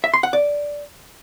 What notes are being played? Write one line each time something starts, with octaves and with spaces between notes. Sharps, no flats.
E5
C6
F#5
D5